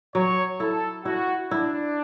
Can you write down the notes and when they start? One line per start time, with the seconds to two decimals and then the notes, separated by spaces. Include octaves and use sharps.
0.14 F#3 C#5
0.60 E4 A4
1.05 E4 F#4
1.51 D4 E4